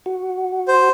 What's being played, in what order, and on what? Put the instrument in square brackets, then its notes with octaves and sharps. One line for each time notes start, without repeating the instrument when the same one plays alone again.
[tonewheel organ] F#4
[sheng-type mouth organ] C5